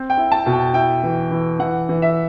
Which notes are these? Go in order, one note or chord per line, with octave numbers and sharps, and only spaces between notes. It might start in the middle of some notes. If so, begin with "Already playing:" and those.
Already playing: C4
G5
E4
A5
B2
G5
E4 G5
E3
E3
E3 F#5
E3
E5